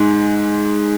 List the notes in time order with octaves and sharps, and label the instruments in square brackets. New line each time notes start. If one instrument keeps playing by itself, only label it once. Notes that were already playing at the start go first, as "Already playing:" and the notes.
Already playing: [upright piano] G#2 G#3 D#4